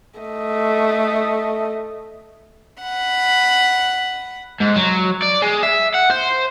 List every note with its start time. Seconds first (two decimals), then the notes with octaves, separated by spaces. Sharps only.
0.20 A3 D#5
2.83 F#5 B5
4.60 G#2
4.76 F#3
5.22 D5
5.42 G#3
5.63 E5
5.94 F#5
6.10 C5